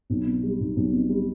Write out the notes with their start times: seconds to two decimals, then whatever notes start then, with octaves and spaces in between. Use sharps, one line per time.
0.10 B1
0.26 B2
0.43 G3
0.60 B1
0.76 B1
0.92 B2
1.10 G3